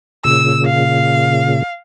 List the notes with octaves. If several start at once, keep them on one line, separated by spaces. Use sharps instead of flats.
A#2 C#3 E6
F5